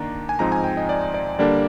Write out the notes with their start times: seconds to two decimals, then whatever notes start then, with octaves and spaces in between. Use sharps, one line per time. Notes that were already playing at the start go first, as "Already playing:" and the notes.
Already playing: D#3 A#3 D4 A#5
0.29 G#5
0.39 G#2 F3 C4 D#4 A#5
0.52 G#5
0.64 G5
0.77 D#5
0.89 D5
1.14 D5
1.39 D3 G3 A#3 D4 D5